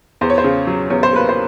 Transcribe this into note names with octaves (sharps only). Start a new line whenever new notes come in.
E2 C5
C#5
C5
C#3
F#3
E2 C#5
C5
A#3 B4
C5